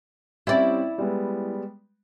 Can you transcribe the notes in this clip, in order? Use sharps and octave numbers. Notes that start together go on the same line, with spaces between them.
G3 C4 C#4 E4 D5
G3 G#3 B3